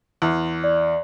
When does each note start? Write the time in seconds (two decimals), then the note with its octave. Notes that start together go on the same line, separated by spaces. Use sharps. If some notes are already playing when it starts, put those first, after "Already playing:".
0.22 E2
0.64 D5